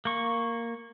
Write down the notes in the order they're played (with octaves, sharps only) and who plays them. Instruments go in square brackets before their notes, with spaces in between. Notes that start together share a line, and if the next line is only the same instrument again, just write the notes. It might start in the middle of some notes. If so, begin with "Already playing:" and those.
[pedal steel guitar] A#3 C#6